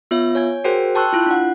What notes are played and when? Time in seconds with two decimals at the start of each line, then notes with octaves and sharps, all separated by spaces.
0.11 B3 F4 C#5 E5
0.35 C#5 G#5 G#6
0.64 F#4 G#4 A#4 C5 G5
0.95 G5 A5 C6 C#6 E6 F#6
1.13 E4 F4 F#6
1.26 D4 F#5